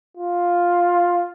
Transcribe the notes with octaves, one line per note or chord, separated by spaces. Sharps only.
F4